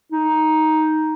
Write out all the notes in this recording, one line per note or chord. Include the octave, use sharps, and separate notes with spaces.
D#4